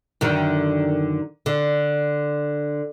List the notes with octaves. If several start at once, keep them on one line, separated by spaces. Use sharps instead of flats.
F#2 D3 D#3
D3